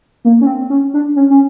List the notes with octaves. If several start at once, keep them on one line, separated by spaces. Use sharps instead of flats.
A#3
C#4
C4
C#4
D4
C#4
C#4